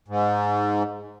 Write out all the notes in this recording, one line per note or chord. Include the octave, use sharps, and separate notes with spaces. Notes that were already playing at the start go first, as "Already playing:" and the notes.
G#2